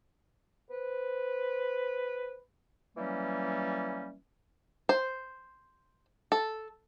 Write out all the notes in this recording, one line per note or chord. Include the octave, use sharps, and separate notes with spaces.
B4 C5
E3 F#3 G3 A#3 C#4
C5
A4